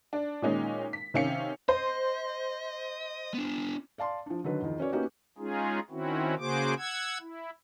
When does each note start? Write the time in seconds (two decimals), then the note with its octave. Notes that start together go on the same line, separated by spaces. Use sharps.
0.13 D4
0.42 A#2 D#3 G#3 C#4 D#4
0.93 B6
1.14 C3 D#3 C#4 F5 C#7
1.69 C5 D#5
3.34 B3 D4
3.98 D5 F5 A5 C6
4.26 F3 D4
4.44 D3 D#3 F#3 B4
4.62 E2 D#3 F3
4.80 C#4 F#4 B4 C#5 D5
4.92 A#3 B3 C#4 D#4 F#4 G4
5.38 G#3 C#4 D#4 F4 G#4
5.90 D#3 C4 C#4 E4 F#4
6.39 C#3 A#3 F#4 G#4 C5 D6
6.78 F#5 E6 G#6
7.21 E4